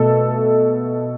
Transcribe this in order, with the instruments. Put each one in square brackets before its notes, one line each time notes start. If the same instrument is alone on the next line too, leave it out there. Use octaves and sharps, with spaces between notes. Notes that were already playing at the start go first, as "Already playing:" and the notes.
Already playing: [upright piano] B2 A3 A4